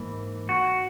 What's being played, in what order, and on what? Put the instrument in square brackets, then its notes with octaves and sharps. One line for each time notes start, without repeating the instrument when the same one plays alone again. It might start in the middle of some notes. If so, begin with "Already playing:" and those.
Already playing: [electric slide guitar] G#2 E3 A#3
F#4